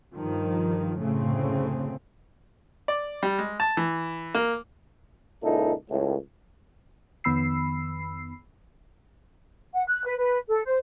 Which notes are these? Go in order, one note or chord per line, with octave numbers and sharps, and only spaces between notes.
G2 D#3 F3
F#1 D2 A2 C#3 A3 C4
D5
G3
G#3
A5
E3
A#3
C#2 A#2 D#4 E4 A4
C#2 A2
F2 D#3 B3 B5 E6 C7
F#5
F#6
B4
B4
A4
C5